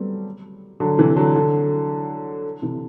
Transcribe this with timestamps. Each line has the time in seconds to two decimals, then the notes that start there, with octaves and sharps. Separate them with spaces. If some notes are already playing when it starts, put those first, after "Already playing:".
Already playing: F#3 G3 A3 B3 C4
0.80 D3 F#3
0.98 C3 E3
1.16 D3 F#3
1.35 D3 F#3
2.62 C3 E3